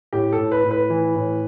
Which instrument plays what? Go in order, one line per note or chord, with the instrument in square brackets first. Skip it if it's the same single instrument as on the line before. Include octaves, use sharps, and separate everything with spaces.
[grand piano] A2 G4
A4
A2
B4
A2
B4
E3
A2